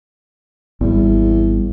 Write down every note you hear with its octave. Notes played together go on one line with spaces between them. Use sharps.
G#1 E2 G3